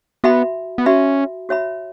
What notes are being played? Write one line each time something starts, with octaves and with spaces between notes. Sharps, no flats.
B3 F#4 E5 B5
B3
C#4 F#4 E5 B5
F#4 C#5 E5 B5